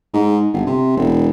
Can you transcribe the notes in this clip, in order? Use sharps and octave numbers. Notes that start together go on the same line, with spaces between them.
G#2
G1
C3
E1